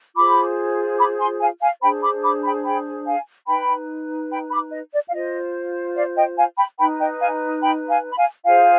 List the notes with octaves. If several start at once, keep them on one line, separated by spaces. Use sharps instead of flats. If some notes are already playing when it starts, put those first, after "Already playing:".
F4 G#4 C5 B5 D6
B5 D6
G#5 C6
F5 G#5
F5 G#5
D4 G#4 C5 G5 B5
B5 D6
B5 D6
G5 B5
G5 B5
F5 G#5
D#4 B4 G5 B5
G5 B5
B5 D6
D#5
D5
F5
F4 C5 D#5
D5 F5
D#5 G5
F5 G#5
G5 B5
D#4 B4 G5 B5
D#5 G5
F5 G#5
G5 B5
F5 G#5
B5
F5 G#5
F4 G#4 C5 F5 G#5